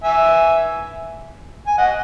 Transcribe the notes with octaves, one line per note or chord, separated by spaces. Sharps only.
E5 G#5
G#5
D#5 F#5